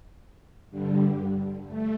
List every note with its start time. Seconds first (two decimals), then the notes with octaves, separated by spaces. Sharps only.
0.71 G2 D3 G3
1.67 A3